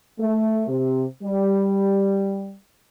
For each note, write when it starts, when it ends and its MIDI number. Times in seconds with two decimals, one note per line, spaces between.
0.19 0.64 57
0.67 1.04 48
1.23 2.55 55